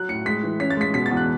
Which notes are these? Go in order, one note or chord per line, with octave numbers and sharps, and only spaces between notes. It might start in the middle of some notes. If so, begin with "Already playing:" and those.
Already playing: F#3 F#6
A2 C#7
G#3 B6
E3
C#4 B6
A6
G#3 B6
B2 B6
A6
E2
F#6